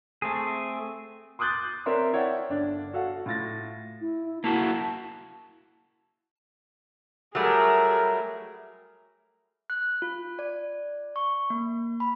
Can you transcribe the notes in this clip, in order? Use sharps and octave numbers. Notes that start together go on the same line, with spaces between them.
A3 C4 G#4
C6 D6 D#6 F#6 G6 A6
C4 A#4 C#5 D5 E5 C6
E4 C#5 D5 F#5 G5
G1 D4
F#4 A4 F5 F#5
A2 F4 A6 A#6
E4
A#3 E4 F#4 A5
F#3 G3 A3 G#4 A#4
F#6
F4
D5
C#6
A#3
B5